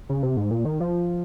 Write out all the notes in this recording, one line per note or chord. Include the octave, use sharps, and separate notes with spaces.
C#3
C3
G#2
A#2
D#3
F3